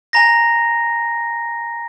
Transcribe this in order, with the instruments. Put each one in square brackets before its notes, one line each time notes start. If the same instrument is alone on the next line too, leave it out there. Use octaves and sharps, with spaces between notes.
[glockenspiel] G#5 A#5 A#6